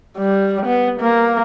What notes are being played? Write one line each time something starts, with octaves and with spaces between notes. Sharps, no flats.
G3
B3
A#3